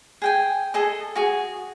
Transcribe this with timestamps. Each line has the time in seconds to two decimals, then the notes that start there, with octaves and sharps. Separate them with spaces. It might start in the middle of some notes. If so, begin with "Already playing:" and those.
0.22 G#4 G5 G#5
0.74 G#4 A4 D#5
1.15 F#4 G#4